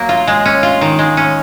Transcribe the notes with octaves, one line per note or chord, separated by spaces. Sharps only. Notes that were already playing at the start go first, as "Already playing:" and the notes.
Already playing: F#3 A#3
F4
G#3
C#4
F4
D#3
G#3
C#4